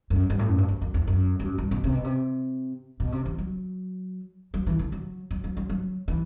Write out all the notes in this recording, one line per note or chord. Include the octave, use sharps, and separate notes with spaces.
F#2
G2
A2
F#2
G2
F#2
F#2
E2
F#2
G2
F#2
G2
B2
C3
B2
C3
B2
C3
E3
F#3
F#3
E3
D3
F#3
F#3
F#3
F#3
F#3
E3